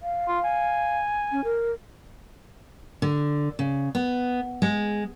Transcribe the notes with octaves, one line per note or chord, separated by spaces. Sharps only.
F5
F4
G#5
C#4
A#4
D3
C#3
B3
G#3